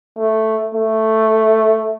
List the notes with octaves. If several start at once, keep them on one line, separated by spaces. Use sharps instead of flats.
A3
A3